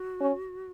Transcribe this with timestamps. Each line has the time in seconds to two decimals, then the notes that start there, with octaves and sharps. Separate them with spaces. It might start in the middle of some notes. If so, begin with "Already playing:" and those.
Already playing: F#4
0.20 C#4